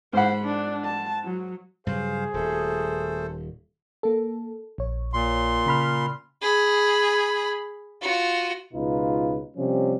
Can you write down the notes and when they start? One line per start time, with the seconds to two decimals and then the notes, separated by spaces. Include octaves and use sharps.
0.13 G#2 C5 F#5 B5
0.44 D4
0.84 A5
1.24 F#3
1.87 G2 C#3 F#3 G#4 C5 F5
2.34 D#1 A3 A4 C5
4.03 A#3 A4
4.78 A#1 C#5
5.13 A#2 C6
5.66 C#3 B5 F6
6.42 G#4 B5
8.02 F4 F#4
8.73 C#2 B2 D#4 F4 B4
9.56 C3 F3 G3 C#4